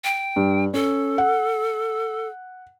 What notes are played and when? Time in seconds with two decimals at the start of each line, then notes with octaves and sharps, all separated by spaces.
0.05 G5
0.36 G2
0.74 C#4 A4
1.18 F#5